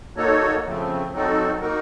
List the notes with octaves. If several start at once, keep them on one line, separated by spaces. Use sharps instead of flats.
A#3 D#4 F#4 A4 C#5
C#3 F3 A3 C4
F#3 C4 D#4 F#4 A4
A#3 D#4 F#4 A#4